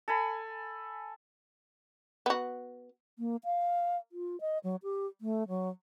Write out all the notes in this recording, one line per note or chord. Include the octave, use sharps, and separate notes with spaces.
A4 G#5 B5
B3 F#4
A#3
F5
F4
D#5
F#3
G4
A3
F#3